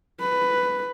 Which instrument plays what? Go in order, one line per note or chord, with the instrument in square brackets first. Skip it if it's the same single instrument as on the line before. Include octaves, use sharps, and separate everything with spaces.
[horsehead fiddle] B4